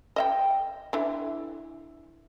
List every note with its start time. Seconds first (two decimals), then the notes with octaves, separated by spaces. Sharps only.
0.16 D#5 E5 G5
0.93 D3 E3